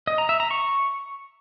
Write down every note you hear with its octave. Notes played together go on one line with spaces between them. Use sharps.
D#5
A#5
E5
A#5
C#6